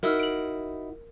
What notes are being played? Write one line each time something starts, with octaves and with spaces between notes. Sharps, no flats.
D#4 E4 F#4 A#4 E6 F6
D7 F#7